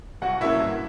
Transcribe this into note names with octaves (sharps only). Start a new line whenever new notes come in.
C2 F#4 F#5
B2 F#3 A#3 C#4 E4 E5
G2